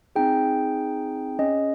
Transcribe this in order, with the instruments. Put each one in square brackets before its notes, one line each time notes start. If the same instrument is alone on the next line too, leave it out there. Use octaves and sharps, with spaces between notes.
[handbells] C4 D#4 G#4 G5
C#4 G#4 D#5